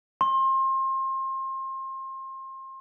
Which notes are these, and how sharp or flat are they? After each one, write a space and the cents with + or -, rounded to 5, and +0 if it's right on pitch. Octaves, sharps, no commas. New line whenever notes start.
C6 +30